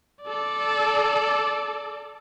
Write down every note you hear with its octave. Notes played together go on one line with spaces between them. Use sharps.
A4 D5